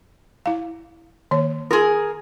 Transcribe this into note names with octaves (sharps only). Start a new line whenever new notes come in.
E4 F5
D#3 A#3 C#5
F4 G#4 A#4 C6